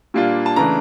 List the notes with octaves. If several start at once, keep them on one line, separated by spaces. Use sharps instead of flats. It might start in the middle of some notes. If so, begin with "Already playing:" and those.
A#2 G3 A#3 D4 F4
A5
C#3 E3 A3 D4 A#5